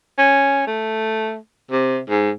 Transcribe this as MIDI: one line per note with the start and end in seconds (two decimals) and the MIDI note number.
0.18 0.62 61
0.67 1.37 57
1.71 1.99 48
2.09 2.31 44